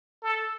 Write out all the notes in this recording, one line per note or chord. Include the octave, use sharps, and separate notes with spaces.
A4